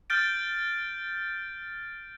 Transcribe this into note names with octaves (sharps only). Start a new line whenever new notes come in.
F6 G6 A6 D7